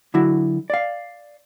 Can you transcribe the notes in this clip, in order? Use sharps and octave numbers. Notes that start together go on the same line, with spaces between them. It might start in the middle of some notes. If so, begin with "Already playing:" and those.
D3 F#3 E4 F#4
D5 F5